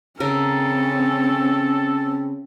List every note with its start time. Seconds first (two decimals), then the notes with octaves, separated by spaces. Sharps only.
0.20 C#3 C4 C#4 A4 A#4